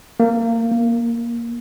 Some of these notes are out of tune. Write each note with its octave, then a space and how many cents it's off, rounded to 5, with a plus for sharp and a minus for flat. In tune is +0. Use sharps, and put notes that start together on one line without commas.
A#3 -20
A#3 +10